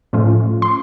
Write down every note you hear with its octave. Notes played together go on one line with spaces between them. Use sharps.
A2 F3 A3 C#4 F4
C6